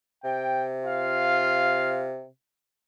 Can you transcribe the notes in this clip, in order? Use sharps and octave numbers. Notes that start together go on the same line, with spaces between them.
C3 G5
F4 F5